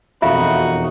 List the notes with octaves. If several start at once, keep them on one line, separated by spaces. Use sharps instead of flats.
E1 F2 D#4 F4 F#4 E5 F5